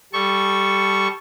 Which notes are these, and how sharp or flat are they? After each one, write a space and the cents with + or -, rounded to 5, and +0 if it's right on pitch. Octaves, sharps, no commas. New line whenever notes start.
G3 +0 A4 -15 C#6 +0